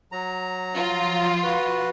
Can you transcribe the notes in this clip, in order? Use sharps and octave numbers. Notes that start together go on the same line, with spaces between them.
F#3 A#5
F3 F4
F#4 B4